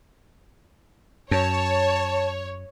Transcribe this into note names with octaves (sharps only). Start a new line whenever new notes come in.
F#2 C#5 A5